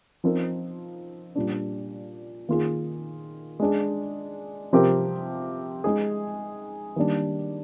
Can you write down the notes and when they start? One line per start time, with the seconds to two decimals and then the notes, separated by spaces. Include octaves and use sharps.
0.24 F3 C4 D#4 A#4
1.35 A#2 G3 D4
2.49 D#3 A#3 F4 G#4
3.60 G#3 D4 G#4
4.73 C3 F3 C4 G4 A#4
5.84 G#3 D#4 G#4
6.96 D#3 G3 A#3 D4